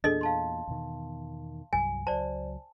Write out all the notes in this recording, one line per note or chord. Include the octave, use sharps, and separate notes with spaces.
E2 A#2 D4 G#4 A4 D#5
F5 A5 C6
E2 B2 D#3
C2 G2 F#3 G#5
C#2 F#3 C5 D5 A5